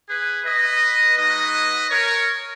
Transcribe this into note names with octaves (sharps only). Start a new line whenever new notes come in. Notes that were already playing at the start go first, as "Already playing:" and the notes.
G#4 B4
B4 D#5
G#3 D#4 F#4 B4 D#5
A#4 C#5